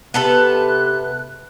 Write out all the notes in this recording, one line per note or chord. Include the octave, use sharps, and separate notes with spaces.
C3 B3 A4 B4 F#6